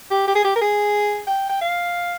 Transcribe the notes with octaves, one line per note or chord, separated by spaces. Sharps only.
G4
G4
G#4
G4
A#4
G#4
G5
G5
F5